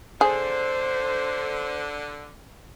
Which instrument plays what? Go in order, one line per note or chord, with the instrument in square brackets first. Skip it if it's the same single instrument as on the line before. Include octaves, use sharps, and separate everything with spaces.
[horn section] D3 [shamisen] G#4 [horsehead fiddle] C5